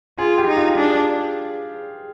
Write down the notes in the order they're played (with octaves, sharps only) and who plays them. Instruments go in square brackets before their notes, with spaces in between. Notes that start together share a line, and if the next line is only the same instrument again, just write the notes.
[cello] F4 [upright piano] G#4
[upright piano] G4
[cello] D#4
[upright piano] F4
[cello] D4 [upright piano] G#4